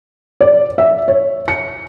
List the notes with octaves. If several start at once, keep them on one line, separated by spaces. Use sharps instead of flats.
D5
E5
C#5
C#7